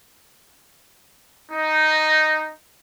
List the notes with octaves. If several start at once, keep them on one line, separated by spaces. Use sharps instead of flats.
D#4